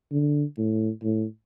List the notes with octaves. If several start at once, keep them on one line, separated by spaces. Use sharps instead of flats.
D3
A2
A2